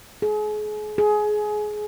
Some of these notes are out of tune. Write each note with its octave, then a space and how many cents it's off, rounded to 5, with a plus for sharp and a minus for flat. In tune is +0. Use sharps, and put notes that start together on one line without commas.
G#4 +35
G#4 +20